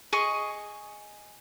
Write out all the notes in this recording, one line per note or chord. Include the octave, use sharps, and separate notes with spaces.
G#4 D#5 C#6